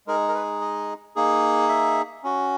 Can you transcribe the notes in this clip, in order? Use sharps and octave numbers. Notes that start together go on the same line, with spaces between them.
G#3 D#4 G#4 A#4
A#4
B4
D#5
A#3 D#4 G#4
E5
C#4 F#4